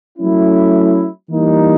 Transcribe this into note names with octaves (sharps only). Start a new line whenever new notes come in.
F#3 A3 C#4 E4
E3 G3 A#3 D#4